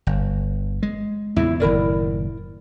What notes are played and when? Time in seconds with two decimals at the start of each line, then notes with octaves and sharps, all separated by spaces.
0.07 G1
0.83 G#3
1.36 E2 A#2 C#3 E4
1.60 F#1 A2 D#3 E4 A#4 D5